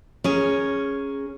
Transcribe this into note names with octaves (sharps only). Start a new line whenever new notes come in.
C#4 G#4 A#4